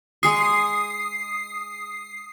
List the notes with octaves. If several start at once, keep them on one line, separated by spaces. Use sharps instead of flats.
G#3 G#4 C#6 D#6 C7